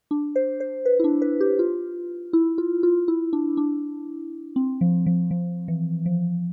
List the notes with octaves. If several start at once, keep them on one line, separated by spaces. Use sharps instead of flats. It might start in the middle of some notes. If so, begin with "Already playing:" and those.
D4
C5
C5
B4
E4
D4
B4
G4
F4
E4
F4
F4
E4
D4
D4
C4
F3
F3
F3
E3
F3